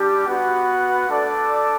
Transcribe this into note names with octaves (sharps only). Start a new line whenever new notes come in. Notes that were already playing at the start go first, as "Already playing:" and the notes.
Already playing: G3 D4 G4
B3 F#4 B4 F#5
A3 D4 A4 D5